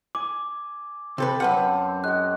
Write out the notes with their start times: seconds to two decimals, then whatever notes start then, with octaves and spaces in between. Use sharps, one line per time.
0.15 G#5 D6
1.18 C3 C4 A4 B4 C5
1.40 F#2 B4 F5 F#5 A5 E6
2.04 G#3 F#4 F#6